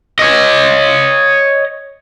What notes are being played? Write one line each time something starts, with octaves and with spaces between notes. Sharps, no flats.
C#5 D#5